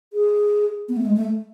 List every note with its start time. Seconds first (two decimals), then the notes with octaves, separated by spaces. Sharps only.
0.13 G#4
0.89 B3
0.97 A3
1.06 G#3
1.17 A3